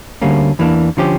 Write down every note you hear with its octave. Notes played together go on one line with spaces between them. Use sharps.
D2 D3 G3 A#3 C#4
E2 E3 A#3 D4
D3 F3 C#4 G4